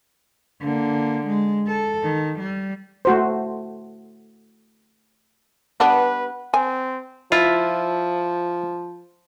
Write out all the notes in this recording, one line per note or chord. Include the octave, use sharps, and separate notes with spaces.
D3 A#3
G#3
A4
D#3
G3
A3 F#4 C5
G3 B3 D4 B4 F#5
C4 G#5
F3 E4 F4